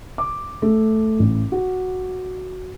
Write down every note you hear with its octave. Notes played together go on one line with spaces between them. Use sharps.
D6
A3
A1
F#4